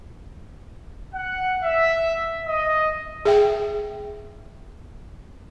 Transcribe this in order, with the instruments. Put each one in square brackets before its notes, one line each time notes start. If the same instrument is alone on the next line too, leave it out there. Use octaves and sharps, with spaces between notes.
[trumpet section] F#5
E5
D#5
[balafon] G#4 E5 G5